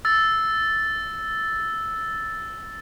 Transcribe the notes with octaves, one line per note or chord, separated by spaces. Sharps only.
E6 A6